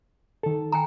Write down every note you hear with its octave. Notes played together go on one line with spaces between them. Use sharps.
D#3 A4
G5 G#5 A#5